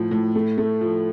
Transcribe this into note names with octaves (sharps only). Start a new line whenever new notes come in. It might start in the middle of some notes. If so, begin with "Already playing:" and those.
Already playing: A2 F3
A2
A3
A3
F3